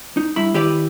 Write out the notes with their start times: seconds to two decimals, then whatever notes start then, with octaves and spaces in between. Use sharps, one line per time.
0.17 D#4
0.36 G2 E4 B5
0.54 D#3 E4 G4 B4 D5